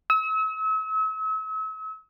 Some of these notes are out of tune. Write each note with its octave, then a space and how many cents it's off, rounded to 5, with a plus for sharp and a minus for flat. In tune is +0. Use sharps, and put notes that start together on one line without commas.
E6 -40